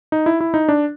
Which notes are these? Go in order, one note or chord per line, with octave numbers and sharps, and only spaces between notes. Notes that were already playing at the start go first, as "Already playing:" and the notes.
D#4
E4
E4
D#4
D4